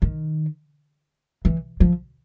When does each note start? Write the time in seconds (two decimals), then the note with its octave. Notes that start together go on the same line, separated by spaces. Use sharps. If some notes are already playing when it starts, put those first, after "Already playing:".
0.02 D#3
1.45 E3
1.80 F3